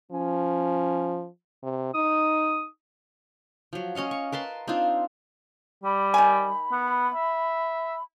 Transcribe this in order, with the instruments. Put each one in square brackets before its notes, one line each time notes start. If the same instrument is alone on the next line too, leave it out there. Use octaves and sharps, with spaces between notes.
[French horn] F3 [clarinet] C#4
[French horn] C3
[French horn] D#4 [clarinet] D#6
[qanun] F3 F#3
C#4 D#5 F5 F#5
C#6
A#4 B4 A5 C6
C4 D4 D#4 F4
[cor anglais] G3 [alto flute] B5
[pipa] D#3 G#5
[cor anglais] B3
E5